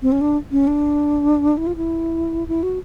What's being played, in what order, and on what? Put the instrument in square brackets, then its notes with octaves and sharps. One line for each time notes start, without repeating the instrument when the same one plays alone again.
[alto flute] C4
C#4
D4
C#4
D4
E4
F4
E4
E4
F#4